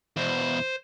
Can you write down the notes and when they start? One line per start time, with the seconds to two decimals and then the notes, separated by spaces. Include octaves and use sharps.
0.17 E2 B2 C5